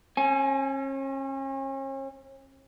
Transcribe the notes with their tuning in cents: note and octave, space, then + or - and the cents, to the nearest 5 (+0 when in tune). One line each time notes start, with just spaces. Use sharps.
C#4 -40 G#5 +15